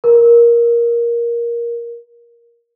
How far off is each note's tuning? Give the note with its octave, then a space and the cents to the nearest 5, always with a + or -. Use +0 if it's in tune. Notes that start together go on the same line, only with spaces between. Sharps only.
A#4 +15